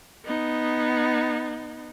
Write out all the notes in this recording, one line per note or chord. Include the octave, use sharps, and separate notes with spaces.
B3 D#4